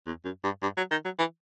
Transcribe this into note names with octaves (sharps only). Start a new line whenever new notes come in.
E2
F#2
G2
G2
F#3
D#3
F#3
E3